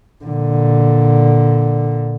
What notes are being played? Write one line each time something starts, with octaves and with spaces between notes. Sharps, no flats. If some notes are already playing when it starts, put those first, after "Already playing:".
A#2 D3